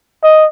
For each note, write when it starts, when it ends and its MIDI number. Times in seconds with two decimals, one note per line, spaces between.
0.23 0.46 75